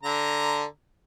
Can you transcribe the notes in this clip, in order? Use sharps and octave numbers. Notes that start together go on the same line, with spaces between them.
D3 A#5